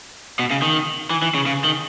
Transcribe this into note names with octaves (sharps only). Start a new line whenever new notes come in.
B2
C#3
D#3
E3
E3
C#3
C#3
D#3